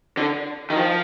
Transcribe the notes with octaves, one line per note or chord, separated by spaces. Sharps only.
D3
D#3
F3